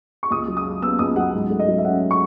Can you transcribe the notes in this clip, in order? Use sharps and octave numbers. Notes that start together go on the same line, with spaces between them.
C#6
C#2 D#6
F#3
D#6
C#3
B3 E6
C#2 D#6
F#3 F#5
G#2
A3
D#5
F#3
E5
C#4 F#5
C#6